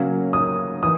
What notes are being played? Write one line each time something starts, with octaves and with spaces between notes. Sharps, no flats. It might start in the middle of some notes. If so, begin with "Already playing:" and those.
Already playing: C#3 F#3 A#3 C#4
D#6
E3 D#6